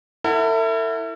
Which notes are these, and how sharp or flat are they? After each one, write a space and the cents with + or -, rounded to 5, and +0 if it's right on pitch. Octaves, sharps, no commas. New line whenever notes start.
E4 +0 A4 +45 F#5 +0